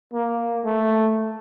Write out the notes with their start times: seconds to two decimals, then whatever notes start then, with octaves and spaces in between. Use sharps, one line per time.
0.13 A#3
0.64 A3